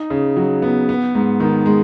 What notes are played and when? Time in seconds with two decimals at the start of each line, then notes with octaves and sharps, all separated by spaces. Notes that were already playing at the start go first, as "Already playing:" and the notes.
Already playing: D#4
0.10 C#3
0.37 F#3
0.62 B3
0.89 B3
1.15 G#2
1.40 D#3
1.66 G#3